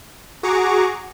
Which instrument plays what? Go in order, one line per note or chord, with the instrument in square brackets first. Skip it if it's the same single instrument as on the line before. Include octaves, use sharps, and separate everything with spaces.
[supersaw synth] F#4 G#4 A#5 C#6 D6